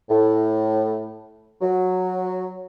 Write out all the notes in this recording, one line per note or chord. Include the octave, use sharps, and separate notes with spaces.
A2
F#3